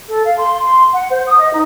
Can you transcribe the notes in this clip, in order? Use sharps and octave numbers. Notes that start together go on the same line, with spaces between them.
A4
F5
C6
C6
F#5
C5
D#6
D#5
D#4